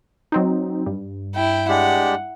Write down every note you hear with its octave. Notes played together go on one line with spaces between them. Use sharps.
F#3 C4 D#4
G2
E4 G5
G#3 D4 G4 F#5